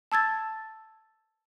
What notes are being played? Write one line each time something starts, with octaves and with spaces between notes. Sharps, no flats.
A5 E6 G#6 A6